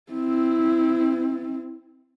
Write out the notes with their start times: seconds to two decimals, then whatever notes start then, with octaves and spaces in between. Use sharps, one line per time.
0.12 C4 E4